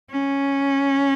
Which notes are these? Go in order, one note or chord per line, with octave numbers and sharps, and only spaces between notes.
C#4